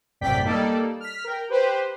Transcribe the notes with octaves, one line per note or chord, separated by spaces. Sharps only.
A1 F#2 C3 D5 G5 B6
G3 A#3 D#4 A4 D5
F6 B6
A#4 G5
G4 B4 C5